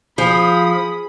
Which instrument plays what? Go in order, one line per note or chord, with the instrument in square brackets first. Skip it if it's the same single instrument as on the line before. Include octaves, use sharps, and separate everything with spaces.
[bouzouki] F3 [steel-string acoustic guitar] G#4 [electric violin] B5 D#6